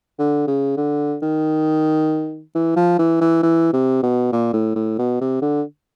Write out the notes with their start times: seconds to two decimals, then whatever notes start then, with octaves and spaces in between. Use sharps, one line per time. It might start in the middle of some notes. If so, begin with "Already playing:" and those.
0.19 D3
0.47 C#3
0.77 D3
1.22 D#3
2.55 E3
2.76 F3
2.99 E3
3.21 E3
3.43 E3
3.73 C3
4.03 B2
4.32 A#2
4.53 A2
4.75 A2
4.99 B2
5.21 C3
5.42 D3